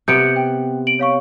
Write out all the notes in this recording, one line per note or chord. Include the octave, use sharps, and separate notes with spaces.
C3 B3 F#5 G6 C#7 D7
G5
D7 F#7
C#5 F5 C#6